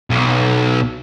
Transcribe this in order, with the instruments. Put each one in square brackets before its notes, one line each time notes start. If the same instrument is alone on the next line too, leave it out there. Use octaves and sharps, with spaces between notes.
[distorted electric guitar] B1